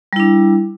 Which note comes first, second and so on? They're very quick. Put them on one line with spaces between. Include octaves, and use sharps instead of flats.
G3 E4 D4